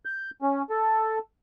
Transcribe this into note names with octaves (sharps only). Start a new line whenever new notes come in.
G6
C#4
A4